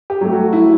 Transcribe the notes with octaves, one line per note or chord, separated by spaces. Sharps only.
G4
F#3 A3
F#4
E4